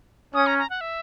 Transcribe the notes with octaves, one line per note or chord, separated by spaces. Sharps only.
C#4 D#6
A#5
A#5
F#5
E5